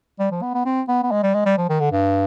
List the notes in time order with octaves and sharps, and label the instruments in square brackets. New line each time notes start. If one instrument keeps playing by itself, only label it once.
[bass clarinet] G3
F3
B3
B3
C4
B3
B3
G#3
G3
G#3
G3
F3
D#3
D3
G2